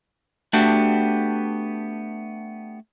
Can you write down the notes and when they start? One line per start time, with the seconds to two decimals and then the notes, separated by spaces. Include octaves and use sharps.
0.53 A3 B3 D4 F#4 G4